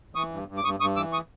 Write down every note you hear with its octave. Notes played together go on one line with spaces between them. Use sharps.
E3 C#6 D#6
G2
G2
D6
G2 C#6 D#6
G2 C#6 D#6
E3 D6 E6
C#6 D#6